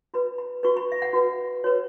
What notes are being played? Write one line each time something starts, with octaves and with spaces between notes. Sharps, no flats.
F#4 B4 B5
B5
F#4 B4 C#6
B5
E5
F#5
F#4 B4
F#4 B4 C#5